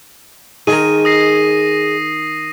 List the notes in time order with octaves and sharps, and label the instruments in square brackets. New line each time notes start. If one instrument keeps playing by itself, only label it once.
[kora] D#3 A#4 [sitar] G#4 D#5 [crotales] D#7
[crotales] D#6 A#6 C7